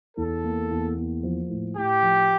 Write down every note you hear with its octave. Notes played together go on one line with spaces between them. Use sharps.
E2 A4
A#3
E2
A#3
F3
A2
A2 G4
F3